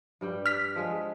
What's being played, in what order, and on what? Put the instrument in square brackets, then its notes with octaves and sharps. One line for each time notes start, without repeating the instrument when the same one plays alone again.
[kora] G2 G3 G5
[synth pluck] F6 B6
[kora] F3 G#3 G#4